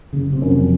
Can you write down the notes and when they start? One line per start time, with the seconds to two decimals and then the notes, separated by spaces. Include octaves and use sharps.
0.13 F#1 C#3
0.33 C3
0.42 F#2
0.51 F2